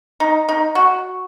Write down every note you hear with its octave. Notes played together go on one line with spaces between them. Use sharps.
D#4
D#4
F#4